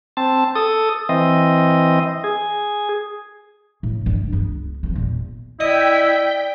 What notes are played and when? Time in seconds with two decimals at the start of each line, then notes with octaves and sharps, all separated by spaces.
0.17 C4 A5
0.55 A4 D#6
1.09 E3 C4 D#5
2.24 G#4
3.83 A2
4.06 G2 D4
4.33 C#2 B3
4.83 F3 C4
4.96 E2 A#2
5.60 E4 D5 D#5 G5 B6